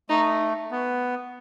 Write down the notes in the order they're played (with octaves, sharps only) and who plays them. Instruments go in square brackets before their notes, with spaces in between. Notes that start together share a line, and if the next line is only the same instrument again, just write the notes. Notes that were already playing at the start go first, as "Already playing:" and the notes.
[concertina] A3 [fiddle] D#4
[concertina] B3